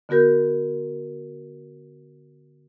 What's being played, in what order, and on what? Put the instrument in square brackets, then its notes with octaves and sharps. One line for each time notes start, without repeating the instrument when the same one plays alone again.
[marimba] D3 B3 F#4 A#4 G6